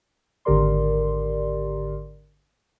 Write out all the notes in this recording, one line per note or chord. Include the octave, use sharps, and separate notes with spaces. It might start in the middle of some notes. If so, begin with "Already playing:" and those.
G#1 D3 G4 A#4 D5 C6